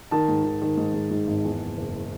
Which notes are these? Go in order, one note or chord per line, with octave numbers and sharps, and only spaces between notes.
D#3 A5
G#2
D#3
D#3
G#2
G#2
G#2
G#1
E2
F#1
F#1